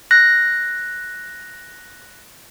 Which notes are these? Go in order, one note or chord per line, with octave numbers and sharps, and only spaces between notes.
F#6 A#6